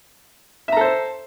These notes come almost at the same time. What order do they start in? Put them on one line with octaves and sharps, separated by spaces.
E5 A#5 A4 C5